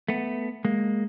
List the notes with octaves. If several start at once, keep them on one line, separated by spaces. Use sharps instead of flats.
A3 B3
G#3 A#3